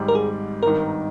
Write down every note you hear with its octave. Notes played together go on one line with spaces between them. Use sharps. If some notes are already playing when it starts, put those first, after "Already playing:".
Already playing: G#1 G#2 G3
A#4
G#4
G#1 G2 D#3 A#4